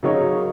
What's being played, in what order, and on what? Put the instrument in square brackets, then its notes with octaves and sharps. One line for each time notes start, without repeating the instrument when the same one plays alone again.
[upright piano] C#3 F#3 D#4 A#4 C#5